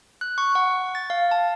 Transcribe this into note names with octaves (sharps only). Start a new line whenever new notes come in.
F#6
C#6
F#5
A6
F5
A5